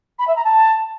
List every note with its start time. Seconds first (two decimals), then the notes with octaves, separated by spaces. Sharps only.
0.19 B5
0.27 E5
0.36 A#5
0.44 A5